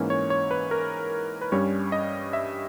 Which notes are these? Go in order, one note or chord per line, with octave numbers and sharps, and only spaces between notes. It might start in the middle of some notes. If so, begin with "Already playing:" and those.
Already playing: G#2 E3 A#3 C#4
C#5
C#5
B4
A#4
B4
G2 G3 C#4 C#5
D#5
E5